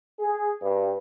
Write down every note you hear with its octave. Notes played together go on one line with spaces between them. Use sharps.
G#4
G2